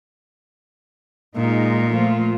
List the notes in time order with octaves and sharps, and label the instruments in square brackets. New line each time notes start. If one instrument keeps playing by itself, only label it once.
[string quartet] A#2 [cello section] G#3 D#4
[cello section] F3 A3 F4